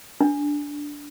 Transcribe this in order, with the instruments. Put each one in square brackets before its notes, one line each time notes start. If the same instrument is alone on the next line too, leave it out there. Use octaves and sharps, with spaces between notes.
[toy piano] D4